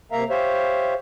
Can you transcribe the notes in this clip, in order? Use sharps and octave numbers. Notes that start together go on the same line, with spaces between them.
C3 A#3 A#4 E5 F5 A#5
G4 C5 C#5 E5 F5